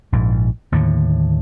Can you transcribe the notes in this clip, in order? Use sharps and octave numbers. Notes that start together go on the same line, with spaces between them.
A#1 G#2
D#2 A2 D3